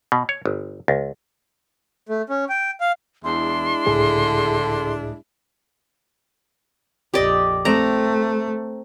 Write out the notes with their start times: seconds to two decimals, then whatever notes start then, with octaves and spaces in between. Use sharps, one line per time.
0.12 B2
0.29 C#5
0.46 G1
0.88 C#2
2.09 A3
2.29 C#4
2.49 G5
2.81 F5
3.24 E2 G#3 D4 E4 C6
3.86 C#2 A2 D3 G#4
7.14 A#1 F2 G4 D5 D#5
7.65 A3 C4 A#5